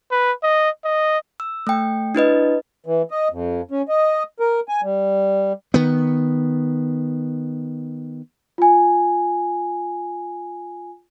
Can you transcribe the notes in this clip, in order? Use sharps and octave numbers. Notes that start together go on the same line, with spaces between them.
B4
D#5
D#5
E6
A3 G5
D4 E4 B4 D#5
E3
D#5
F2
C#4
D#5
A#4
G#5
G3
D#3 B3
F4 G#5